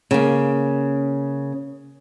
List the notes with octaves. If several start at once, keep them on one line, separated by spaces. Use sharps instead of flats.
C#3 A#3